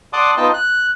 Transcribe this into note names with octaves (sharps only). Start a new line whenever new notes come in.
D5 F#5 A5 C6 D6 D#6
B3 D#4 F4 D#5 G5 A5
F#6